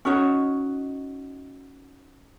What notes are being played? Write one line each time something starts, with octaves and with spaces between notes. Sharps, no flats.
C#4 D#4 F#4 C#5